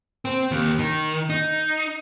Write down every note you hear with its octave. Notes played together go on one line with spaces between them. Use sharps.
C4
D#2
D#3
D#4